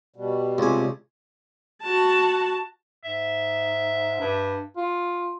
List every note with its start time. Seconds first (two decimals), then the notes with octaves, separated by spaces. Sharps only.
0.16 B2 G3
0.58 C#2 C3 G#5
1.83 F#4 A5
3.04 G#2 E5
4.20 G2
4.76 F4